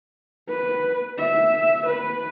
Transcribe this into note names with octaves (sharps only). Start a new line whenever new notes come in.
B4
E5
B4